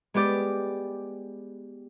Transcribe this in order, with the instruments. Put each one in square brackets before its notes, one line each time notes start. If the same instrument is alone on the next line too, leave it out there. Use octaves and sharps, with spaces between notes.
[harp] G#3 B3 G4 D5